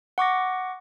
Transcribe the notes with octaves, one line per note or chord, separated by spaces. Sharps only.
F#5 C#6 D6 A#6